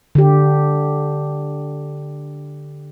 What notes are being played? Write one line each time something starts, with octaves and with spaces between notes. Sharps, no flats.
D3 G4